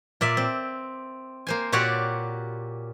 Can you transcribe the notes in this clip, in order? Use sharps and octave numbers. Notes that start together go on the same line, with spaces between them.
A#2 D5 E5
C4
A#3 C5 G#5
A#2 F#4 G4 C#5 D5 F#5